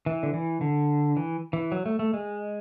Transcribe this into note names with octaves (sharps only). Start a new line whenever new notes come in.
E3
D3
E3
D3
E3
E3
F#3
A3
A3
G#3